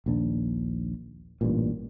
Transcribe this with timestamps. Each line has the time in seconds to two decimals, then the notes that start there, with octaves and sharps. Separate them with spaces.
0.06 A#1 D#2 D4
1.41 A1 G2 A#2